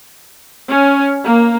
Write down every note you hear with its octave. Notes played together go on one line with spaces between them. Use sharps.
C#4
A#3